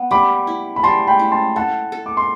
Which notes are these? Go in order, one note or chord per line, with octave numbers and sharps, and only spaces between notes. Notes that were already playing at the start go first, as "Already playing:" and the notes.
Already playing: B3
G3 B5 D6
E4
B5
G3 A5 C6
G5 B5
E4
A5 C6
A4 F#5 A5
A4
D6
C6